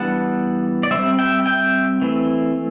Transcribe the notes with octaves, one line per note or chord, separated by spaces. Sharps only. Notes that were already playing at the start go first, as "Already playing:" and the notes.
Already playing: E3 G3 B3 D4 F#5 A5
D5
G3 C4 C5 E5
E5 G5
E5 G5
E3 A3 C4